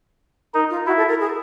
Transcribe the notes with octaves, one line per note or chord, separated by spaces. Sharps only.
D#4 A#4
F4
E4 F#4
A4
A#4
G#4